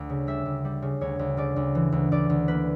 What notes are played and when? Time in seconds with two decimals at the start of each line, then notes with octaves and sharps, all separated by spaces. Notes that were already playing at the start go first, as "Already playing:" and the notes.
Already playing: D2
0.10 C#3
0.27 G3 E5
0.45 D2
0.65 G3
0.82 C#3
1.01 D2 C#5
1.19 D2
1.37 C#3 D5
1.56 D2
1.75 E3
1.92 D2
2.12 D2 D5
2.30 D2
2.48 A#3 B4